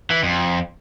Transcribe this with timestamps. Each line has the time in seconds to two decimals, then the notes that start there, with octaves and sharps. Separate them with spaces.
0.10 E3
0.23 F2